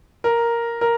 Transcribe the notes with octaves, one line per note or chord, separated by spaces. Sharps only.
A#4
A#4